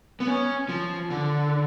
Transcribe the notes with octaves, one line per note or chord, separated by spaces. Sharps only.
B3
C#4
F3
D3